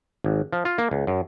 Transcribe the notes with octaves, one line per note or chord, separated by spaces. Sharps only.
G#1
F3
F4
A#3
C#2
F#2